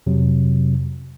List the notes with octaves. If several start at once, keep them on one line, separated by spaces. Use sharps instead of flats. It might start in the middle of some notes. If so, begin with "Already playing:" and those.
F2 C3 F#3